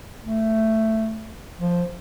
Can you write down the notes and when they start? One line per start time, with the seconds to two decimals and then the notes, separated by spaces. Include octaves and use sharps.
0.23 A3
1.59 F3